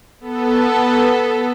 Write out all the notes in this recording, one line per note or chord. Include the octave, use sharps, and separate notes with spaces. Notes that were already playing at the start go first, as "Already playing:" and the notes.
B3 A4